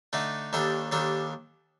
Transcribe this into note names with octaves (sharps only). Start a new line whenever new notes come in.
D3 A3 D#4
D#2 D#3 G3 D4 A4
D#2 D#3 G3 D4 A4